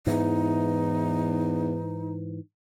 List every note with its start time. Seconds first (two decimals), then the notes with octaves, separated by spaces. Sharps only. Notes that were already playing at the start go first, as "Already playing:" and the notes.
0.07 E2 G#2 E3 D#4